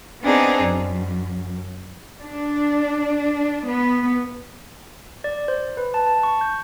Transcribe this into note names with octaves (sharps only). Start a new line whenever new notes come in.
B3 C4 D4 D#4 G#4
F#2
D4
B3
D5
C5
B4
A5
A5
C#6
G6